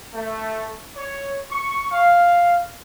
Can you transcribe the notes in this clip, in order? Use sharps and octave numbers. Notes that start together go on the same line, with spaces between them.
A3
C#5
C#6
F5